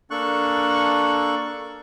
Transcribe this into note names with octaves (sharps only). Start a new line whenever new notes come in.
A#3 D4 A4 C#6 F#6